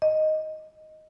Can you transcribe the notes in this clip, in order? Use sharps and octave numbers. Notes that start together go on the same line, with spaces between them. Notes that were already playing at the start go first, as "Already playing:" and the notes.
D#5